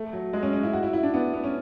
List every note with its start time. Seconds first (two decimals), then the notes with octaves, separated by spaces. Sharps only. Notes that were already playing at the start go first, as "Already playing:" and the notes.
Already playing: A3
0.13 F#3
0.33 G#3
0.43 C#4
0.53 C#4
0.63 E4
0.73 F#4
0.83 E4
0.93 E4
1.03 D4
1.14 B3
1.34 B3
1.44 C#4